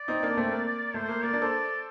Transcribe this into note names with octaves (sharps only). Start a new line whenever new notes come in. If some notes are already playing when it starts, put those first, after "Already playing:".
Already playing: D5
C4 D#4
A#3 D4
A3 C4
A#3
A3 C5
A#3
A#3 D5
A#3 D4
A4 C5